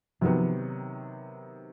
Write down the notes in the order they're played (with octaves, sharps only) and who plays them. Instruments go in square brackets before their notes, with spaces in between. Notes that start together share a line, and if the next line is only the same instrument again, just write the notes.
[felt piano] C3 D#3 F#3 B3 [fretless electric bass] F3